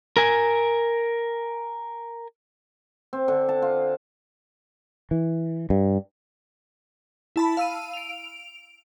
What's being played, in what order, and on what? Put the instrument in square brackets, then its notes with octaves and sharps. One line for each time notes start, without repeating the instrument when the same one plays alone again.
[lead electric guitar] A#4 G#5
[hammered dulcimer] C4
D3
A5
F4
[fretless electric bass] E3
G2
[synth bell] E4 A5 B5
F5 E6 D#7
D7 F7